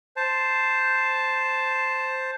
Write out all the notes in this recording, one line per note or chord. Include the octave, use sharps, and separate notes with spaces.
C5 A5